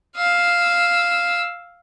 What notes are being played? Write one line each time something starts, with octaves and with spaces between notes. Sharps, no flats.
F5 E6